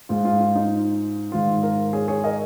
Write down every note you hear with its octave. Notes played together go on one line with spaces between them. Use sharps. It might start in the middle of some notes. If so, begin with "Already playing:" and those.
G#2 G#3 F4
F4
F4
D#4
G#2 D#3 G#3 F4
F4 A#4
G#4 C#5
G#4 C#5
A#4 D#5